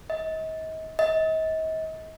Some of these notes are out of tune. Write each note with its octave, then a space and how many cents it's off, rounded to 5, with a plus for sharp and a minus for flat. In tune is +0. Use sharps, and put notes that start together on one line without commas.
D#5 +40
D#5 +40